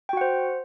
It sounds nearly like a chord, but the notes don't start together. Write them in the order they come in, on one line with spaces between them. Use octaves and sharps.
G5 F#4 F#5 C5